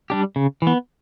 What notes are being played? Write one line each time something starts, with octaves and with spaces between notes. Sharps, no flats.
G3 D4 G4
C#3
E3 B3